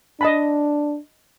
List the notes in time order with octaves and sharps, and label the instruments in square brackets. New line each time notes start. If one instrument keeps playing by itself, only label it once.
[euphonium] D4 [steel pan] D#5 A5 B5